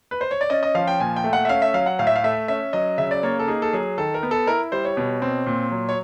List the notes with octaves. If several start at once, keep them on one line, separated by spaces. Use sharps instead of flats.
B4
C5
C#5
D5
C#4 D#5
D#5
F3 F5
G5
A#2 G#5
G5
A3
F#5
E5
C#4 F5
E5
F#3 F5
F#5
A2 F5
E5
F5
A3 E5
C#4 E5
F#3 D#5
C#3 E5
D5
A#3 C#5
A4
D#4 G#4
A4
F#3 G#4
D#3 A4
A#4
B3
A4
E4 A#4
G3 C5
C#5
B2
C4
A#2
F#3
C#5